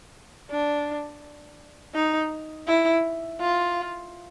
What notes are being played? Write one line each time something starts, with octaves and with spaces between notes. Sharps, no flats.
D4
D#4
E4
F4